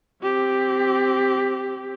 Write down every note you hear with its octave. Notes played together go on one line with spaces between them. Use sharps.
C4 G4